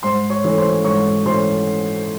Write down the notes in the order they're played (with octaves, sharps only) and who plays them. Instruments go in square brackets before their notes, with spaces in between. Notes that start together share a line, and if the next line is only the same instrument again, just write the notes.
[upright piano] G#2 C5 C6
C#5 C#6
E3 A3 C#4
C5 C6
G#2 C#5 C#6
E3 A3 C#4 C5 C6